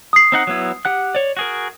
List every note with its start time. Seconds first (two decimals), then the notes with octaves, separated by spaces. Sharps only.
0.13 D#6 C7
0.32 C4 D#4 F#5
0.47 F#3 B3 E4
0.85 G4 F#5 F#6
1.15 C#5 D5
1.37 F#4 G#4 A#4